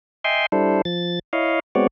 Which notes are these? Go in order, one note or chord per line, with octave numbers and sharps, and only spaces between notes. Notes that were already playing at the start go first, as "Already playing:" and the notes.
D#5 E5 G5 G#5 C6
G3 D4 E4 A4 C5
F3 A6
E4 C#5 D#5 F5
G#3 B3 C4 F#4 C#5 D5